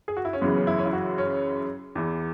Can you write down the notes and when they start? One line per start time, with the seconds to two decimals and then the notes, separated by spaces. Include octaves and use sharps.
0.08 G#4
0.17 F#4
0.25 E4
0.33 C#4
0.41 F#2 C#3 E3 B3
0.56 C#4
0.67 E4
0.78 C#4
0.86 E4
0.93 F#4
1.18 C#4
1.95 E2 E3